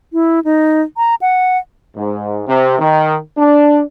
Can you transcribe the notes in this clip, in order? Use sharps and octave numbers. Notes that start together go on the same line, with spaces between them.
E4
D#4
A#5
F#5
G#2
C3
D#3
D4